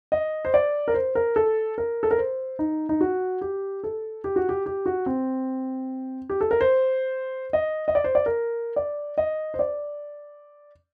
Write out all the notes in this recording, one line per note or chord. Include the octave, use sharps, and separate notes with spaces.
D#5
C5
D5
A#4
C5
A#4
A4
A#4
A4
A#4
C5
D#4
D#4
F#4
G4
A4
G4
F#4
G4
G4
F#4
C4
G4
A4
A#4
C5
D#5
D#5
D5
C5
D5
A#4
D5
D#5
C5
D5